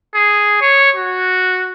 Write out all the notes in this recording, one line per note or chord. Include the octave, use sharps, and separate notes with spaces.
G#4
C#5
F#4